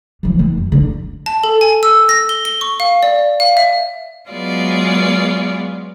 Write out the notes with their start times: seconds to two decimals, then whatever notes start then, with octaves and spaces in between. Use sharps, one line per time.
0.23 E3 F3
0.39 D#3
0.58 F#2
0.72 D3
1.26 A5
1.44 A4
1.61 G#5
1.83 E6
2.09 A#6
2.29 G7
2.45 G7
2.61 C#6
2.80 F5
3.03 D5
3.40 F5
3.57 E5
4.28 F#3 G#3 B3 F4 C#5 D5